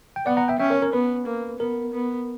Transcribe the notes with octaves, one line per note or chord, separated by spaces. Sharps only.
G5
B3 D5 F#5
F#5 A#5
E5 G5
C#4 E5 G5
A#4 C#5
A#4
B3 B4
A#3
B3 A#4
B3